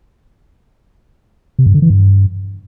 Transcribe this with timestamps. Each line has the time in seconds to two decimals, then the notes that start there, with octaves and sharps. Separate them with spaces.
1.59 C3
1.66 G2
1.74 D3
1.82 E3
1.90 G2